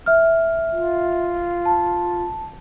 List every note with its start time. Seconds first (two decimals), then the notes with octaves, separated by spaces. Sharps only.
0.06 E5 F6
0.72 F4
1.65 A5